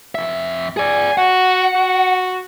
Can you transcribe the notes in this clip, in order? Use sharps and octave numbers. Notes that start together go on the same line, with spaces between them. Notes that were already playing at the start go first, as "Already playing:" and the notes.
F2 E5
G#4 D5 G#5
F#4 F#5
F#4